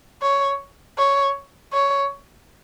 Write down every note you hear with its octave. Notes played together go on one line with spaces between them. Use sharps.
C#5
C#5
C#5